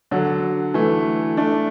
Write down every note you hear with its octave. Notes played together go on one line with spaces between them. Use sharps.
D3 F#3
E3 A3
A3 D4